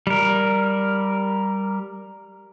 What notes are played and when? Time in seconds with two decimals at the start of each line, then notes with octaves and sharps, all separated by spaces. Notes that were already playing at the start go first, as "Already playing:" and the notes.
0.07 G3 A#4